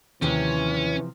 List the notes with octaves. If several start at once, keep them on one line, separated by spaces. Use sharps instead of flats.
D#2 C3 E3 F3 C#4 G4